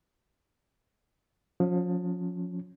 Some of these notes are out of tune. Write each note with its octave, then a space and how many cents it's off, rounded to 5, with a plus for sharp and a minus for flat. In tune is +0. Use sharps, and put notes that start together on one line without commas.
F3 +30 C#4 +0